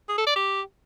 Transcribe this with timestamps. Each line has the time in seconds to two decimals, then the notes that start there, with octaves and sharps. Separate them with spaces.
0.09 G#4
0.18 A4
0.27 D5
0.36 G4